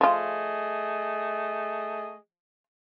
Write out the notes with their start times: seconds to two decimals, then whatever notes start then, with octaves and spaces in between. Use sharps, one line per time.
0.01 F3 A3 F4 G#4 D#5